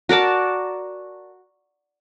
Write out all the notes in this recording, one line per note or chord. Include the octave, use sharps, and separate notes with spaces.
F#4 A#4 D5 A5